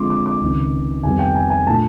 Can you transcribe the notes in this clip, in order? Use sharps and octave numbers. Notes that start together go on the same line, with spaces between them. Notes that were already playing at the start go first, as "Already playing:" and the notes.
Already playing: D3 F3 G#3 C4 C6 D6
D6
D6
C#2 C3 D#3
F2 C3 D#3 G3 B3 G#5
G5
G#5
G#5
A#2 F3 A3 D4 A5